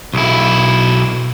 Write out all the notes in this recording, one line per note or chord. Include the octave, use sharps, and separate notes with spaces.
B1 E4